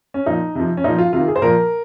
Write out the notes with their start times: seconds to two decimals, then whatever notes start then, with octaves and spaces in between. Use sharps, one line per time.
0.14 C#4
0.26 A#2 F3 D#4
0.55 C3 F3
0.77 C#4
0.84 A#2 F3 D#4
0.98 F4
1.13 C3 D#3 F4
1.28 G#4
1.36 C5
1.42 A#2 F3 A#4